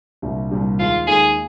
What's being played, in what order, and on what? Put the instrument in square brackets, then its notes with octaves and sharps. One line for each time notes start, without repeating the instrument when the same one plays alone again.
[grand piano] C2 A#2 G3 D4
C2 A#2 G3 D4
[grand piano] D#2 D#3 G#3 [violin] F4
[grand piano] D#2 D#3 G#3 [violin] G#4